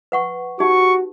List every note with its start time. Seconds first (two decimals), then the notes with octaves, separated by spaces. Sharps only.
0.12 B4 F#5 C#6
0.60 D#4 F#4 G4 C#6